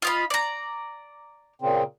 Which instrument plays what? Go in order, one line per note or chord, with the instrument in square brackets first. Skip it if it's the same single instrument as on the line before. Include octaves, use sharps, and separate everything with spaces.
[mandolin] F4 D#5 B5
D5 A#5
[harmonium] A#2 C#3 C4